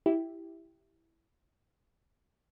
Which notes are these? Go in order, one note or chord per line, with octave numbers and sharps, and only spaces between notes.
E4 G4